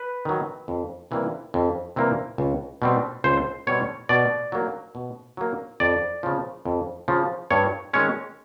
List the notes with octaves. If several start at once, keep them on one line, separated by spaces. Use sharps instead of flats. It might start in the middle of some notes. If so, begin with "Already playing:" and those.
Already playing: B4
D#3 F#3
F2
C3 E3 G3 A#3
F2
C3 E3 G3 A#3
C#2
B2 G3 C4
C#2 C5
B2 G3 C4 C#5
B2 D5
F#3 A#3
B2
F#3 A#3
F2 D5
C#3 F3
F2
C#3 F3
G2 C#5
D#3 G#3 C#4 C#5